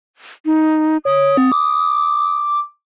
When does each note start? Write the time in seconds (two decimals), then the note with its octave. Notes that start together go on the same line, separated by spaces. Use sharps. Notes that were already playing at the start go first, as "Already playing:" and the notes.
0.46 D#4
1.05 C#5 D#6
1.37 C4
1.52 D6